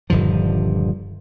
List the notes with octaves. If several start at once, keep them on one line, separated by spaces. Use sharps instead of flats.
D#1 G2 D3 F3